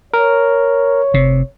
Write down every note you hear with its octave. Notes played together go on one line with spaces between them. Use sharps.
A#4 C#5
F1 C3